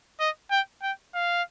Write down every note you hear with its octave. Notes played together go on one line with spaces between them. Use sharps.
D#5
G5
G5
F5